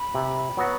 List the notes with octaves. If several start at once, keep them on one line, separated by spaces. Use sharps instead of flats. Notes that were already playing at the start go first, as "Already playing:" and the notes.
Already playing: B5
C3
F#3 B3 F#4